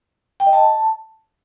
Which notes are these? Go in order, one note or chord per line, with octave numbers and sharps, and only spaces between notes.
G5
D#5
A5